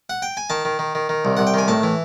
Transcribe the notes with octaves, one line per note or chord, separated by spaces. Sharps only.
F#5
G5
G#5
D#3 A5
D#3
D#3
D#3
D#3
C2
C2 F#5
G5
D#3 G#5
A2 A5
E3